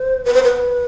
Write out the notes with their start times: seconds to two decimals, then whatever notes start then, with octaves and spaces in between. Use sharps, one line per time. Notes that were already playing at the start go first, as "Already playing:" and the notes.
Already playing: C5
0.25 B4
0.34 C5
0.43 B4